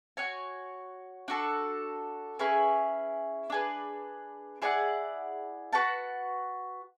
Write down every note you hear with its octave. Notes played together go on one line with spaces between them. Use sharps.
F#4 C#5 G#5
D4 F#4 A4
C#4 E4 G#4 B4
D4 G#4 B4
E4 G#4 D5 F#5
F#4 B4 F#5 A5